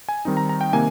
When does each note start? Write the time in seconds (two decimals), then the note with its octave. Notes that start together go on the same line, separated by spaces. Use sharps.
0.09 G#5
0.25 D#3 G3 C4 D#4
0.37 A#5
0.49 A#5
0.61 G5
0.73 C3 D#3 A#3 G#5